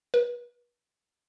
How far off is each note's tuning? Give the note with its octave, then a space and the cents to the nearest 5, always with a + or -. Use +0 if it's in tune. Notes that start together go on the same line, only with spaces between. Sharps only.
B4 -35